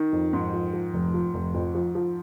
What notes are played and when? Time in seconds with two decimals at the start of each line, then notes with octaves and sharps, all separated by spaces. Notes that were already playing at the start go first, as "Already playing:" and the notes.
Already playing: D#3
0.12 F2
0.33 G#2 F3
0.53 F3
0.73 F3
0.94 F1
1.14 F3
1.34 F1
1.54 F2
1.75 F3
1.95 F3